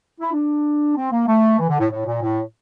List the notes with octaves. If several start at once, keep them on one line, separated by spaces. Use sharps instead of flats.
E4
D4
C4
A#3
A3
E3
D3
A2
A2
A#2
A2